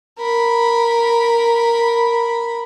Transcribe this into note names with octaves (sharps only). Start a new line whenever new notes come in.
A#4 B5